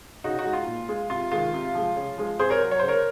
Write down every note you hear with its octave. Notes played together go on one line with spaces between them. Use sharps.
C#3 D#4 F#4
D#4 F#4
G#3
F4
A#2
G#3
C3 F4
D#3 G#3 F4
C3
F3 G#3
C#3
F3 G#3
C3 G#4 C5
A#4 C#5
F#3
C#5
C#3 C5
A#4 C#5